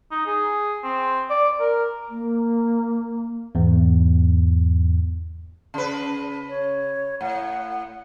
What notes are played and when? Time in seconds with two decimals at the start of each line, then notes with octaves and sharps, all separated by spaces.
0.11 D#4
0.26 G#4
0.84 C4
1.30 D5
1.60 A#4
2.09 A#3
3.55 E2 G#2
5.74 C#3 B4
6.49 C#5
7.21 A2 F#5